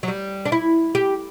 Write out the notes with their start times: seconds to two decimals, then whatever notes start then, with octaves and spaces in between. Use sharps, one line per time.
0.03 F#3
0.08 G3
0.46 D4
0.52 E4
0.95 G4